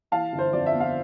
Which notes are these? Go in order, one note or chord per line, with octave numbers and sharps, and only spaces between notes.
E3 F5 A5
G1
C5
F2 D5
E5
B3
F5